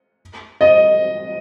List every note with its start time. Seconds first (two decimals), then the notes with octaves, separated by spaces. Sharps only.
0.61 D#5